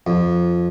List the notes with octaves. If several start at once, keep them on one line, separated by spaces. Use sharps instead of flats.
F2